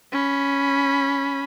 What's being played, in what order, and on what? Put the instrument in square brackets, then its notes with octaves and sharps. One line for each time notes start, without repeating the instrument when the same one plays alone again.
[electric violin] C#4 B5